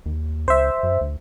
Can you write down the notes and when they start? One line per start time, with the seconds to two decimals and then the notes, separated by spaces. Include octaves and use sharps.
0.06 D#2
0.48 C#2 C5 E5
0.83 F#2
1.01 D2